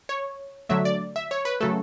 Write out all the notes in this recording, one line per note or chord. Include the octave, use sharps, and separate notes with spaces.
C#5
D3 F#3 A3 E5
D5
E5
C#5
B4
C#3 F#3 A3 A4